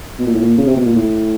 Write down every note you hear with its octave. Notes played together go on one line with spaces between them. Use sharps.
B2
A#2
A2
A#2
C#3
C3
B2
A#2
A2